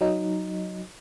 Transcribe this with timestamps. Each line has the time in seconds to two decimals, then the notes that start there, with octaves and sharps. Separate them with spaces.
0.01 F#3 D#4